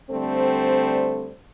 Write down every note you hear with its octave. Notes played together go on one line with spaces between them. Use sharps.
D3 G3 A3 C4 A4 C5